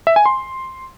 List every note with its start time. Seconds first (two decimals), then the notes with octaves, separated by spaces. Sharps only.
0.07 E5
0.16 G#5
0.26 C6